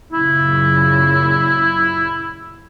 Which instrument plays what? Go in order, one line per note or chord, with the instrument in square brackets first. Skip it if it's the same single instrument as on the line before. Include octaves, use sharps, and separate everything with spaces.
[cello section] F#2 A#2 C#3 [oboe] E4